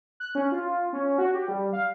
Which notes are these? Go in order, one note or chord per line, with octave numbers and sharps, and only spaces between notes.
F#6
C#4
F4
C#4
F#4
G4
G3
F5